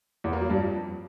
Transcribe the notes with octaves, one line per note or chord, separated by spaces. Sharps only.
E2
A#3
F#3
G2
F2